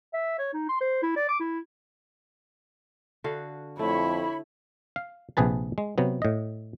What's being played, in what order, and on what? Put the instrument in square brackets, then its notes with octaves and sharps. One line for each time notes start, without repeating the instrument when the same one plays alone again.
[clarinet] E5
C#5
D#4
C6
C5
E4
D5
D6
E4
[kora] D3 F#4 F5
[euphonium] F2 [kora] A3 [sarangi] E4 [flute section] C#5 B5
[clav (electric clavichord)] F5
A#1 C3 G#4 B4 A5
G#3
C3 F#3 B3
A2 D#5